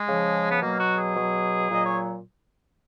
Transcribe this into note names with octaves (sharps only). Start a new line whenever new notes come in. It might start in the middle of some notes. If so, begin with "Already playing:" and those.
Already playing: G#3
C#3 F3
B3
B2 F#3 A#3
F#4
G#4
B2 F#3
A#2 F#3 D#5
C#5